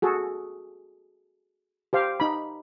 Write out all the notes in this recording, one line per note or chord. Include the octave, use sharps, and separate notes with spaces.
F#4 G#4 A4
G4 C5 F5
D#4 B5